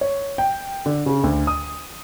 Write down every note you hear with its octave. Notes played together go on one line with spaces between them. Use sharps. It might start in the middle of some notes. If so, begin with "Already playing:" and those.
C#5
G5
D3
C#3
D2
D#6